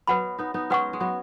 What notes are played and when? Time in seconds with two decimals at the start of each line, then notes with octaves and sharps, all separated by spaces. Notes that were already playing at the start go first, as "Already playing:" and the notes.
0.07 F#3 B3 B4 F#5 B5
0.38 B3 D#4
0.54 B3 D#4
0.70 G#3 C#4 B4 F#5 C#6
0.93 G#3
1.00 F#3 B3